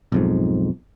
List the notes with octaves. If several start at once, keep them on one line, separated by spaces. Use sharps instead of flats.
B1 F2 G#2